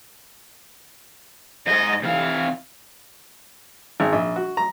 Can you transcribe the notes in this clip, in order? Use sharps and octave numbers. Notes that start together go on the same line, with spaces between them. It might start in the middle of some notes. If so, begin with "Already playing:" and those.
F2 G#2 D#5
C3 E3 F5
G#1
A#1
F#4
A#5